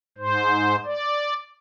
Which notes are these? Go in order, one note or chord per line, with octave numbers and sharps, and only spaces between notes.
G#2 C5
D5